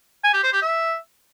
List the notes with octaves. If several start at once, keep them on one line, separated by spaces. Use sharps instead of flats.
G#5
G4
C5
G4
E5